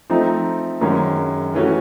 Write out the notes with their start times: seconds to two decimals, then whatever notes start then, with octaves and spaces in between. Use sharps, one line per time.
0.10 F3 A3 C4 D#4
0.81 F#2 D#3 G#3 C#4
1.54 E3 A3 C#4 F#4